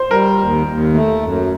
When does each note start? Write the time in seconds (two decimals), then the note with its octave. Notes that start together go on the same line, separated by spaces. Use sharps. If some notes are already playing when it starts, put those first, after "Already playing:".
Already playing: C5
0.10 G3 A#4
0.39 D#2
0.66 D#2
0.94 A3
1.22 F#2